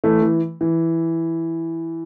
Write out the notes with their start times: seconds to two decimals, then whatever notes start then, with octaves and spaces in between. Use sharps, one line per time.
0.04 E3 A3
0.22 E3
0.61 E3